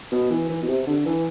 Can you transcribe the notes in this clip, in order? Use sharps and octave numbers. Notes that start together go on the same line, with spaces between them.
B2
E3
E3
B2
C3
D3
E3